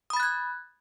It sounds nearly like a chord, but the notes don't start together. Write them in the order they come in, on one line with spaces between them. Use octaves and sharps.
D#6 B5 A6 F#6 G#6